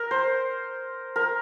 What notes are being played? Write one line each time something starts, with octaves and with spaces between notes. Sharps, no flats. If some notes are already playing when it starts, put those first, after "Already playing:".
Already playing: A#4
C5
A#4